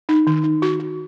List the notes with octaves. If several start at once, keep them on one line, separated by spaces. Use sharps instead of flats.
D#4
D#3
D#4
F#4
F#4